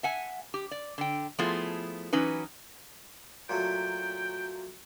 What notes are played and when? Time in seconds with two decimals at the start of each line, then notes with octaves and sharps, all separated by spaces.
0.03 E5 F#5 G#5
0.54 G4
0.71 D5
0.98 D3 G5
1.39 F3 A3 B3 E4 F4 G#4
2.13 E3 F#3 C#4 D#4 B4
3.49 A#2 F#3 A3 G5